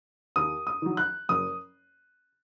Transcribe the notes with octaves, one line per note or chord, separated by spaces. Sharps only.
D#2 D#6
D#6
D#3 F#3
F#6
F#1 D#6